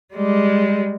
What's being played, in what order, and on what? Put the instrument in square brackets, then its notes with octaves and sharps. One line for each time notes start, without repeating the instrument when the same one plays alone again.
[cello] G3 G#3